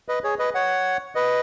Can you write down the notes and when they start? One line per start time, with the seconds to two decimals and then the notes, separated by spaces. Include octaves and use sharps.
0.09 B4 D#5
0.24 G#4 C#5
0.39 B4 D#5
0.55 C#5 F#5
1.15 B4 D#5